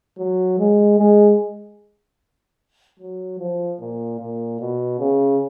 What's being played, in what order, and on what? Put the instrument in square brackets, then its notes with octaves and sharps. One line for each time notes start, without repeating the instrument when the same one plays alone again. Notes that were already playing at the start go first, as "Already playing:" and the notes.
[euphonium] F#3
G#3
G#3
F#3
F3
A#2
A#2
B2
C#3